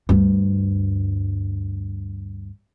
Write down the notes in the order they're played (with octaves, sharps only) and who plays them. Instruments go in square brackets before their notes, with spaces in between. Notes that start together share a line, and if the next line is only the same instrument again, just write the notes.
[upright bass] D2 G2